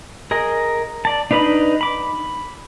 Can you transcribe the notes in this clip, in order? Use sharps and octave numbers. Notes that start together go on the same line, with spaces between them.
G#4 A#4 D#5
D5 A5
D4 D#4 B4 D#5 B5
B5 D6